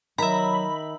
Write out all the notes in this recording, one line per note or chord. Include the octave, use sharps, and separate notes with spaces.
D#3 F#3 E5 A#5 B5